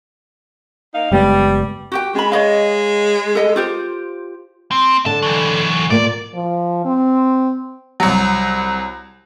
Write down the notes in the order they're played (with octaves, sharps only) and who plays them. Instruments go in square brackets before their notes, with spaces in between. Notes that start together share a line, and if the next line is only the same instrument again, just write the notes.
[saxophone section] A#3 D#4 F5
[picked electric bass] F#1 G#3 B3 [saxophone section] G3
[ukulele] F#4 G4 G5
[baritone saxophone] G#3 [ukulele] C#4 B5
[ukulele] C#5 D#5 F5
A4 D#5
F4 G4 C5
[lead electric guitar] C4
[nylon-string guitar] D3 [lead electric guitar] A5
[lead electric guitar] E3 F#3
[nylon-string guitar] A#2 A#3 [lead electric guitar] D5
[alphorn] F3
C4
[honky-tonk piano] C2 F#3